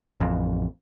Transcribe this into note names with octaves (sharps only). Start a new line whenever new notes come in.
A1 F2